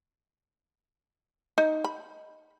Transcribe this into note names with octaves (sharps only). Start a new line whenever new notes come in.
D#4
B5